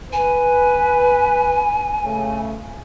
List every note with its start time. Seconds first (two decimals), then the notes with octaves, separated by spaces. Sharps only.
0.13 B4 G#5
2.05 C#3 A3